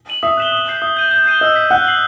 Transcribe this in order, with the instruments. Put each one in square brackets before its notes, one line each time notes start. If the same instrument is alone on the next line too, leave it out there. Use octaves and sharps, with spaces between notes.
[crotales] D#7 F#7
[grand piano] E5 [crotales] D#6
[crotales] F#6 B6 E7 G7
D#6
G6 C7
[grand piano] E5 [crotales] D#6
[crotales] G6 D#7 F#7
G6
C7 D#7 G7
[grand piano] D#5 [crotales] E6
[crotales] G6 B6
[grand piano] F#5 [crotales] F#6
[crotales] C7 F#7